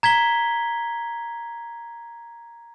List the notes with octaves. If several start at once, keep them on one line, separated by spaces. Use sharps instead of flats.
A#5 G#6 B6 G7